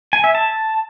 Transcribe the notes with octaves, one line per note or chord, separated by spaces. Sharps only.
G#5
E5
A5